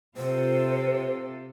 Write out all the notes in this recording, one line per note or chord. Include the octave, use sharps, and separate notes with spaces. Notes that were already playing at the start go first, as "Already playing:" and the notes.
C3 F4 A4 C5